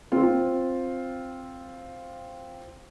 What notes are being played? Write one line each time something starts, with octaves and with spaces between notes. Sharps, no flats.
C4 F4